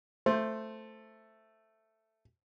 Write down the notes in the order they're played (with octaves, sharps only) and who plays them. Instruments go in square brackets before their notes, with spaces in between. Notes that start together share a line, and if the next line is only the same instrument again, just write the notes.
[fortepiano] A3 [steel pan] C5